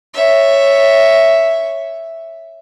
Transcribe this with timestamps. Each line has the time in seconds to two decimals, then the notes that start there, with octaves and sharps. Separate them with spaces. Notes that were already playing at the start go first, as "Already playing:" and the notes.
0.14 C#5 E5